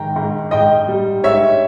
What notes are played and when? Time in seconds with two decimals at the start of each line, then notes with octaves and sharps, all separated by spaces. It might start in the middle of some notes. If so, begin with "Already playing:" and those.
Already playing: G#2 D#3 G5 A#5
0.16 G#2
0.51 G#2 D#5 G5
0.88 G3
1.24 G#2 C#5 E5